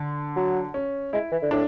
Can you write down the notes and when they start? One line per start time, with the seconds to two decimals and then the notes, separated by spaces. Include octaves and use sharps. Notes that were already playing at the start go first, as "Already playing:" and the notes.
Already playing: D3
0.36 F#3
0.74 C#4
1.13 G#3 E4
1.32 E3
1.42 D3
1.51 A2 D4